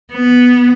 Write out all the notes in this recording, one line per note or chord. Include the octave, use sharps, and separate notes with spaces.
B3